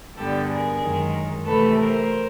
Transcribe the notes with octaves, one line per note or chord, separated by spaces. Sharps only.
G2 D3 G3 B3 G4 A4
G#4 A#4
F#2 D#3 G#3
C3 E3 A3 A4 B4
A#4 C5